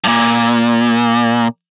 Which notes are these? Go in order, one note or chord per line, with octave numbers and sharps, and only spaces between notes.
G2
A#2